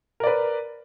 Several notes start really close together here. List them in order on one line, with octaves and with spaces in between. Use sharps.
A#4 D5 B4